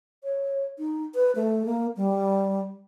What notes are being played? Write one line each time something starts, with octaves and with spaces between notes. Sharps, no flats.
C#5
D#4
B4
A3
A#3
G3